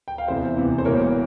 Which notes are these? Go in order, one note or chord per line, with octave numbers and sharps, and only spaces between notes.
G5
F5
E2 C3 E3 C5 E5
E2 C3 E3
C5
E1 E2 E3 A#3 A#4 C#5